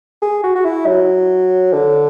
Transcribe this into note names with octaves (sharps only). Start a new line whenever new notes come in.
G#4
F#4
F#4
E4
F#3
D3